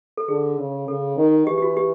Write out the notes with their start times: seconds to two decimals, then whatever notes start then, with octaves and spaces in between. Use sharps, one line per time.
0.17 A4
0.28 D3 G#4
0.59 C#3
0.88 C#3 A4
1.17 D#3
1.47 E3 G4
1.58 G4
1.62 F#4
1.77 G4